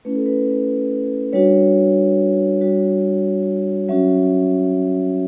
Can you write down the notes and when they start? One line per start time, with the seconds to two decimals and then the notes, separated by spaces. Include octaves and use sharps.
0.05 A3 C#4 E4 B4
0.16 A4
0.26 B4
1.33 G3 D4 F#4 C#5
2.61 G3 D4 F#4
3.89 F#3 C#4 F#4 E5